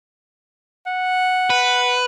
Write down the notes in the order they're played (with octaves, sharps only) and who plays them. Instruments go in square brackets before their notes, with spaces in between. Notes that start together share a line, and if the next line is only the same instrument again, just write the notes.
[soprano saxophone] F#5
[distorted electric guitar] B4